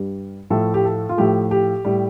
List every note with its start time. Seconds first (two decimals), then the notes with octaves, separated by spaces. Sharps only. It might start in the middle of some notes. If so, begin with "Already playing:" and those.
Already playing: G2 G3
0.50 A2 F3 A3 A4
0.74 G4
0.85 A4
1.09 F4
1.17 A2 F3 A3 G4
1.51 G4
1.85 A2 G3